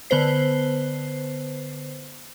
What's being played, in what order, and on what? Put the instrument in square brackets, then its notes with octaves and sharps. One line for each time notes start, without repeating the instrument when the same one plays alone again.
[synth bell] D3 B3 B4 C5 C7